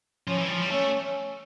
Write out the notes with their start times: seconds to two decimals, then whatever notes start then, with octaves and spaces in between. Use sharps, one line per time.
0.28 F3 C#4
0.38 E3
0.46 G3
0.50 F3
0.61 G3
0.71 A3 C#4